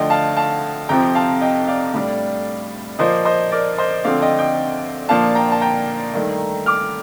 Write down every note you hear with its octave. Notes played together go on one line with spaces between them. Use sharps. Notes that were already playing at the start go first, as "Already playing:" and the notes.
Already playing: D2 D3 F3 D#5 G5
F5 A5
F5 A5
F2 C3 F3 C4 G5 A#5
F5 A5
D#5 G5
D5 F5
A2 G3 D4
A#2 F3 A#3 C5 D#5
C5 D#5
A#4 D5
C5 D#5
D2 D3 F3 A3 C4 D5 F5
D#5 G5
D#5 G5
A#2 F3 A#3 D4 F5 A5
G5 A#5
A5
G5 A#5
G2 D#3 A3 D#4
D6 F6